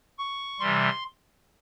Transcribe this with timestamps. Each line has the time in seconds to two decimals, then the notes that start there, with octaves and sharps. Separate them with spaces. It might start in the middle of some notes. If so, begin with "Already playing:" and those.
0.18 C#6
0.60 C3 E3 G3 C6